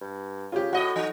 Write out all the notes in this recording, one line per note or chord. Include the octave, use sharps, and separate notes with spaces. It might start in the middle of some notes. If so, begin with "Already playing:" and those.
G2
C#3 F4 G4
A2 F#4 D#5
F3 D#4